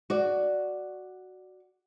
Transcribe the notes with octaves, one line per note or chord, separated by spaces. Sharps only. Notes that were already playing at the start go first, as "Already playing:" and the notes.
F#4 D5